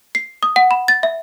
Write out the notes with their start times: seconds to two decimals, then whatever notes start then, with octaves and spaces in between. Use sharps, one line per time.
0.15 C7
0.43 D#6
0.56 F#5
0.71 B5
0.88 A6
1.03 E5